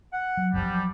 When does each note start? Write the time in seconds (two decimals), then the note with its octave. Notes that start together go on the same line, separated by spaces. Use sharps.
0.13 F#5
0.37 F#3
0.53 F#1 C2 C3 F3 G3
0.66 F#3